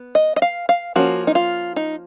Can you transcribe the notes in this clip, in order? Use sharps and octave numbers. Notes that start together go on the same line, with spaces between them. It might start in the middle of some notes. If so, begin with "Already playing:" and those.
Already playing: B3
D#5
D#5
F5
F5
F3 A#3 C#4 F#4
D#4
F4
D#4